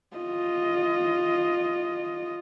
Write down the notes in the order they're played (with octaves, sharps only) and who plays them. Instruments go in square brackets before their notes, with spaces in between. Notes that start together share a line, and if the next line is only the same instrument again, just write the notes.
[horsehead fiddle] F4 D#5